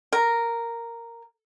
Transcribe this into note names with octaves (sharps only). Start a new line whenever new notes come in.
A#4